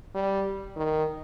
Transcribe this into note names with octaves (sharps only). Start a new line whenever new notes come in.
G3
D#3